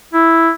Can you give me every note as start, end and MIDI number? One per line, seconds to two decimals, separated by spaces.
0.14 0.51 64